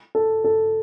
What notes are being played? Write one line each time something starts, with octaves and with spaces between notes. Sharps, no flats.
A4
A4